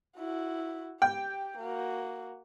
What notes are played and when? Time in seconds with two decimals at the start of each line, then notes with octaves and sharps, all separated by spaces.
0.18 E4 F#4
1.02 G4 G5
1.58 A#3 F#4